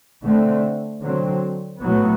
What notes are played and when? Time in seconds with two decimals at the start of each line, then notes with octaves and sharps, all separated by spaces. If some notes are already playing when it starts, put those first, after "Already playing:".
0.23 D3 A3 C4
1.01 D3 F#3 C4
1.80 A2 F#3 B3